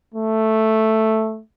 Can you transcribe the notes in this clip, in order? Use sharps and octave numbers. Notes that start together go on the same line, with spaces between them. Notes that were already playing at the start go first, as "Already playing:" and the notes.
A3